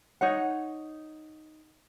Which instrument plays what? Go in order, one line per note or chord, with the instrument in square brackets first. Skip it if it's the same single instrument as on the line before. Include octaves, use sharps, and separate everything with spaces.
[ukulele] D#4 C#5 F#5